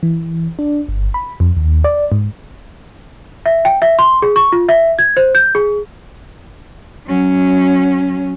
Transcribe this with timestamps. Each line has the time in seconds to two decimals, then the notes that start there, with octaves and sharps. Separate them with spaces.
0.03 E3
0.59 D4
0.89 G1
1.14 B5
1.40 F2
1.56 D#2
1.84 D5
2.12 G#2
3.46 E5
3.65 G5
3.82 E5
3.99 C6
4.22 G#4
4.36 C#6
4.52 F4
4.69 E5
4.99 G#6
5.17 C5
5.35 G6
5.55 G#4
7.07 F#3 C#4